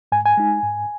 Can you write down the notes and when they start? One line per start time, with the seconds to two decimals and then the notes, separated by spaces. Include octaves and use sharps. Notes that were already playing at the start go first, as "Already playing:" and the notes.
0.12 G#2 G#5
0.25 G#5
0.37 G#3 D#4
0.63 G#2